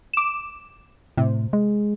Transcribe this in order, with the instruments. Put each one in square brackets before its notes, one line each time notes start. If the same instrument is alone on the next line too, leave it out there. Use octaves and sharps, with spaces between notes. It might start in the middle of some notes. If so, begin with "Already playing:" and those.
[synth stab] D6 E7
[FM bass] A2 [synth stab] C3
[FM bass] G#3